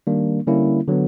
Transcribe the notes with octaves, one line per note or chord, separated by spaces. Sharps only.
D#3 G3 A#3 D4
D3 G3 A#3 C#4 E4
D3 F#3 B3